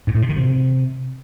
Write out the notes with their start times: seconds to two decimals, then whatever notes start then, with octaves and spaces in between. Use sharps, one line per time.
0.07 G#2
0.15 A2
0.22 C3
0.29 D#3
0.36 C3